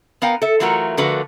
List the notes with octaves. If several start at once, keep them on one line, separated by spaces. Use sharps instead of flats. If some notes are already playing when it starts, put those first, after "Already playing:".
B3 A#4 F5 G5
A4 E5
E3 F#3 A3 F4 F#4 A#4
D3 F3 A3 F#4 A#4 B4